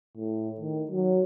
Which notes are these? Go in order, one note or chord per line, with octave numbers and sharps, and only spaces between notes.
A2
D#3
F#3